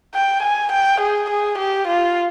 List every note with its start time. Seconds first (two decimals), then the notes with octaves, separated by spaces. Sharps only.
0.14 G5
0.43 G#5
0.72 G5
1.01 G#4
1.30 G#4
1.58 G4
1.88 F4